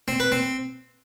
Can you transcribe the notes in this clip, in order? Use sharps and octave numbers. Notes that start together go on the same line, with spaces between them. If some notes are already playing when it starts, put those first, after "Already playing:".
C4
B4
C4